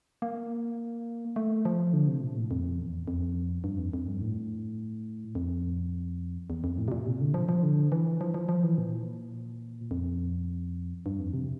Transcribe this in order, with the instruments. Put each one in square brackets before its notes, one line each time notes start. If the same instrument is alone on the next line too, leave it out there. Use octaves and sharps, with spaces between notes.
[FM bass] A#3
A3
F3
D3
C3
A#2
A2
F2
E2
F2
G2
F2
F2
G2
A2
F2
E2
F2
A2
C3
A#2
C3
D3
F3
F3
D3
E3
F3
F3
F3
E3
A#2
F2
G2
F2
C3